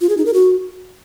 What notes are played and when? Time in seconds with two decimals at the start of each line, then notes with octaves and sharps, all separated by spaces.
0.01 F4
0.09 G#4
0.17 D#4
0.26 A#4
0.34 F#4